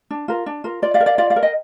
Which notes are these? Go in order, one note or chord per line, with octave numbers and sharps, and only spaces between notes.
D4
F4 A#4
D4
F4 A#4
F4 D5
D5 F5
A#4
D5 F5
F4 D5 F5
D5 F5
A#4
D#5 G5